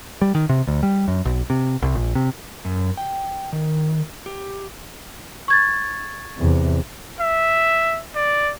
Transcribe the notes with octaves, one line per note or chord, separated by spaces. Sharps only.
G3
D#3
C3
D2
G3
F#2
B1
C3
C2
A#1
C3
F#2
G5
D#3
G4
C#6 G#6 A6
E2 C3
E5
D5